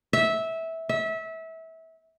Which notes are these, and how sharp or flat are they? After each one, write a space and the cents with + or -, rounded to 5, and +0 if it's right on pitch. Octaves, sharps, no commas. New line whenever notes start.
E5 -15
E5 -25